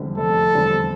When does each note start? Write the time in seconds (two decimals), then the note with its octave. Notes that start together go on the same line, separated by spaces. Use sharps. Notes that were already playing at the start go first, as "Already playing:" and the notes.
Already playing: F1 E2 D3 G3 C4
0.17 F1 A4
0.54 E2 D3 G3 C4